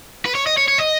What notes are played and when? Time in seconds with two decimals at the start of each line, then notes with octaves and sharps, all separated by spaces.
0.26 B4
0.35 C#5
0.47 D#5
0.58 C#5
0.68 C#5
0.79 D#5